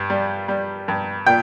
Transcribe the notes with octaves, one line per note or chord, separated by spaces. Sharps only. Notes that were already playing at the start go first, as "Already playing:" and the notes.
Already playing: G2
G3
G3
G2
A#2 G5